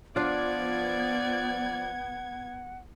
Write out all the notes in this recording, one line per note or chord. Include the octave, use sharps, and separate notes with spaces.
F3 B3 D4 F4 D5 F#5 G#6